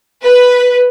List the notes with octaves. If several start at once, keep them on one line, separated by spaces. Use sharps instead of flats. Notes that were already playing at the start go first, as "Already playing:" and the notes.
B4